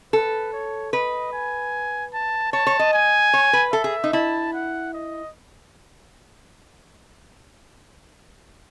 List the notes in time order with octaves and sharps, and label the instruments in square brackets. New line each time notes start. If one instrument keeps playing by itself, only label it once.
[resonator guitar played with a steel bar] A4 [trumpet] B4
[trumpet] C#5
[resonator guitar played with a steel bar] B4 [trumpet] D#5
[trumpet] G#5
A5
[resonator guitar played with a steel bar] C#5 [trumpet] A5
[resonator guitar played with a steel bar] C#5
D#5
[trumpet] G#5
[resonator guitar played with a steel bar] C#5
B4
[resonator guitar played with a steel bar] A4 [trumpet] E5
[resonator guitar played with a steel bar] G#4
D#4
[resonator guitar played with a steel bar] E4 [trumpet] A5
[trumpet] F#5
D#5